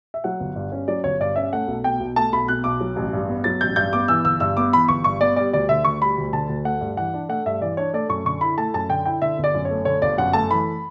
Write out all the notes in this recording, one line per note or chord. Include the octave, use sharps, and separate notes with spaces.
E5
F#3 F#5
G1
G2
C#4
F#3 D5
G1 C#5
G2 D5
C#4 E5
A3 F#5
B1
B2 G5
B1
A3 A5
B1 B5
B2 F#6
B1 D6
F#3
A1
G2
B3
F#3 A6
A1 G6
G2 G6
B3 D6
E3 E6
G1 E6
G2 E6
B3 D6
E3 B5
G1 C#6
G2 C#6
B3 D5
G3 D5
D2 D5
D3 E5
D2 C#6
G3 B5
D2
D3 A5
D2
A3 F#5
G2
E3 F#5
D4
A3 F#5
G2 E5
E3 D5
D4 C#5
A3 D5
F#2 C#6
D3 C#6
E4 B5
A3 A5
F#2 A5
D3 G5
E4 G5
D3 E5
G1
D5
F#2
C#5
A3
D3 C#5
G1 D5
F#2 F#5
A3 A5
E3 B5